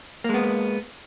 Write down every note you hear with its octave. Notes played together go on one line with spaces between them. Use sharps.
G#3 A#3 B3